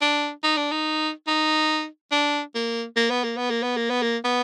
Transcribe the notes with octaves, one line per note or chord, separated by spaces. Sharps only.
D4
D#4
D4
D#4
D#4
D4
A#3
A#3
B3
A#3
B3
A#3
B3
A#3
B3
A#3
B3